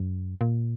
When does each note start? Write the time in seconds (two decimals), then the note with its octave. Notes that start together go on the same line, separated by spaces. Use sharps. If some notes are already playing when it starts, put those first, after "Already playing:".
Already playing: F#2
0.41 A#2